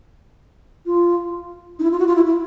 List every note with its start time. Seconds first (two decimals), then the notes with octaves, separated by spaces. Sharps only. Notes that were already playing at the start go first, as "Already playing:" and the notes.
0.86 F4
1.79 D#4
1.83 E4
1.92 F4
1.99 F#4
2.07 F4
2.15 E4
2.26 E4